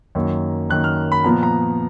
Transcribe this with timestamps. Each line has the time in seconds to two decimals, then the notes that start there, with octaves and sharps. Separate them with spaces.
0.15 F#2 D#3 A#3
0.69 F#2 D#3 A#3 F#6
0.84 F6
1.12 B5
1.24 A#2 F3 B3 A#5
1.43 A#5